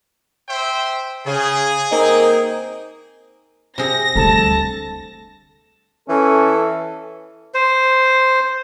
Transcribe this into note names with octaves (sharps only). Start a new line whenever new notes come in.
C5 E5 G5
C#3 G#4
A#3 C4 D#4
C3 G#4 A#6
D2 G3 A4 A5
E3 C#4 A4
C5